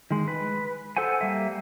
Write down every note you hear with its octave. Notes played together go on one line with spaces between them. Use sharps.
D#3 G#3
B4
A4 C5 F#5 G#5
G3 A#3 E5